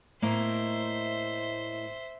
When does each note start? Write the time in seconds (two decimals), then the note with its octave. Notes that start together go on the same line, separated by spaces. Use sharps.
0.22 A2 A#3 C5 D#5 E5